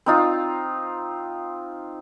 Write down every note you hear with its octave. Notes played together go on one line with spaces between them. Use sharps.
C4 D#4 F4